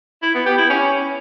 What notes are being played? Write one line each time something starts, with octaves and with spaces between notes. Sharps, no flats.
E4
B3
G4
E4
C#4